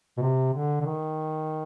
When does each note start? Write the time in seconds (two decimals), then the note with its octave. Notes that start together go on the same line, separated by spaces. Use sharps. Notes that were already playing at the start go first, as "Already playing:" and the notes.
0.17 B2
0.22 C3
0.54 D3
0.81 D3
0.86 D#3